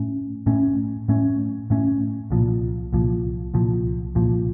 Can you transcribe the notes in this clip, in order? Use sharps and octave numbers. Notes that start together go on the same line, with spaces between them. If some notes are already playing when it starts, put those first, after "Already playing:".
Already playing: A2 A3 C#4
A2 A3 C#4
A2 A3 C#4
A2 A3 C#4
C2 A#2 F3
C2 A#2 F3
C2 A#2 F3
C2 A#2 F3